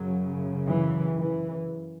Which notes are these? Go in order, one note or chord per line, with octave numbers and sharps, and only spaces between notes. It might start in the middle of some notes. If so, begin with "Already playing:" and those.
Already playing: F#2 C#3 F#3
E3
E3